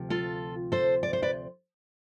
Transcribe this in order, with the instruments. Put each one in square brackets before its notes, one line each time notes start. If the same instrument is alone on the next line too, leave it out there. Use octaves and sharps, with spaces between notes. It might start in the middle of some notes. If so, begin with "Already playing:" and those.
Already playing: [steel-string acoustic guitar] D2 C3 F3
F4 A4
A4 C5
D5
C5
B4 D5